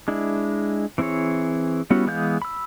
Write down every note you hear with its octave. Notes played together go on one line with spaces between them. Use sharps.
G#3 D4 E4
E3 C4 E4 G#4 C#5
G3 B3 C#4 E4 F#4
E3 G#3 B3 F5 G6
B5 E6